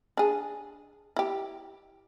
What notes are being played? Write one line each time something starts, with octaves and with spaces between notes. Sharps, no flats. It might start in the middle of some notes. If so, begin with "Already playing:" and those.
D4 G#4
E4 G4